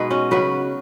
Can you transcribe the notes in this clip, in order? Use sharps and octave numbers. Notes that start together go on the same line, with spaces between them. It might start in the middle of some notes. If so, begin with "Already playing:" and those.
Already playing: B2 G#3 B3 D#4 B4
C#4 F#4
C#3 F#3 F#4 B4